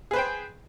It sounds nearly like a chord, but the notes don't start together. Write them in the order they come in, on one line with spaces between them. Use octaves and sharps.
G#4 B4 C5 G5